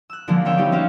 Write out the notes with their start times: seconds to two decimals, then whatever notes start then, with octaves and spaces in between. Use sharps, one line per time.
0.10 E6 F#6
0.28 D3 F3 G#3 A#3
0.45 B3 C4 C#5 E5 G5
0.58 G3 D#4 G4
0.72 C4 C#4 F4 F#4 E5 F5